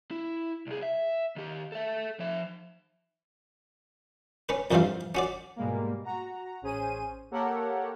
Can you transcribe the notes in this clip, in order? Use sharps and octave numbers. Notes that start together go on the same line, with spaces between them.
E4
C2 G#4
E5
D#3 G4
A4 E5
F3 E5
C#4 B4
F2 D3 E3 F3 G3 F5
C#4 F#4 D5
G#2 B2 G3 G#3 A#3
F#4 A#5
A1 C#4 G#4 C5 D#7
A#3 G4 A4 A#4 C#5 F#5